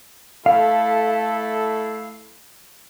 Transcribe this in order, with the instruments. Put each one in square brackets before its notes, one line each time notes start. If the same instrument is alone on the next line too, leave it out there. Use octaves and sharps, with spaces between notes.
[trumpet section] A3 E4 A4 [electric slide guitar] F5